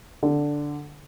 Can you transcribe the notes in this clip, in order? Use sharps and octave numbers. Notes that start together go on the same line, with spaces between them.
D3